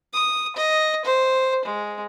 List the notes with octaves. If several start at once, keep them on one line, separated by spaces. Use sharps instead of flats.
D#6
D#5
C5
G#3